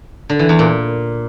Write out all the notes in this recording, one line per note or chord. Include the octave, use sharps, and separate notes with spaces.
D3
E3
E2
A#2